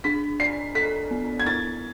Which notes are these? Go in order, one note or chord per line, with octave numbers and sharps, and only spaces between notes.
D4 B6
D5 C7
A4 B6
B3
G#6
E4 A6